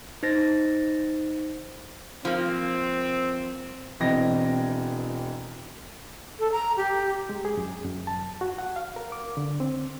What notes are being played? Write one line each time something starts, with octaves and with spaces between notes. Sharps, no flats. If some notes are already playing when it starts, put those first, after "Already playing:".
D#4 C5 A6 A#6
F3 A#3 C4
E1 E3 C4 D#5 G5 A#6
A4
A#5
G4
G#3
G#4
F#2
F#2
A5
F#4
F#5
F5
A#4
D6
D3
C4